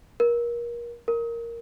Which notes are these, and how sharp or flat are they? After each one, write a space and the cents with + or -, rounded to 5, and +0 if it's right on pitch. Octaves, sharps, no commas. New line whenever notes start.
A#4 +30
A#4 +0